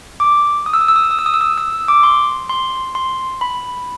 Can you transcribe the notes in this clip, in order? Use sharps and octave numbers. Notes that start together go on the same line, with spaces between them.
D6
D#6
E6
D#6
E6
D#6
E6
D#6
E6
D#6
E6
D#6
E6
D6
C6
C6
C6
B5